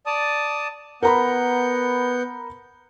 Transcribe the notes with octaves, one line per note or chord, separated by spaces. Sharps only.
D5 A5 D#6
B3 A#4 F#5 A#5 B5 G6